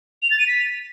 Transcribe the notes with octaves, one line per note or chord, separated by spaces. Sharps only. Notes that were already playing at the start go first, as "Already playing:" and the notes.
F7
A6
D#7
B6